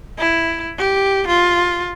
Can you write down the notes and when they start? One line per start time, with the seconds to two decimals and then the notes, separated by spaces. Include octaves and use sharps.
0.18 E4
0.78 G4
1.28 F4